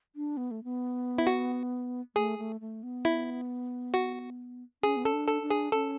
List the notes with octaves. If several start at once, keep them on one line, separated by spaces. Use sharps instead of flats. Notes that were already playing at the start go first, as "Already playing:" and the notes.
D4
B3
A3
B3
E4
F#4
A3 G#4
A3
A3
B3
E4
F#4
C#4 G#4
B3
C#4 A4
D4
A4
D4
G#4
C#4 A4